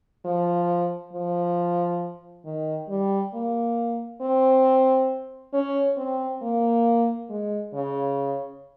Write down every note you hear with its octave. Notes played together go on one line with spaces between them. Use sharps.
F3
F3
D#3
G3
A#3
C4
C#4
C4
A#3
G#3
C#3